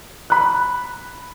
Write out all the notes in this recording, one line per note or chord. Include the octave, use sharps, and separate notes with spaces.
B5 F#6